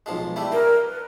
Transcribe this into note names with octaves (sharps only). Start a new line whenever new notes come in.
B1 F3 G#3
G3 A3 E4
A#4 G5
B4